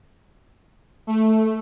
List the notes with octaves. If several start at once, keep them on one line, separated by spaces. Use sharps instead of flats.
A3